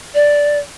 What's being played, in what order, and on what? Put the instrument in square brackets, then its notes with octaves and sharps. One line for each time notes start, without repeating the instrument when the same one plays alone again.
[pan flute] D5